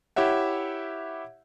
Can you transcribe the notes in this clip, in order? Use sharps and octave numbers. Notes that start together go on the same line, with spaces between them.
E4 G4 C#5 E5 F#5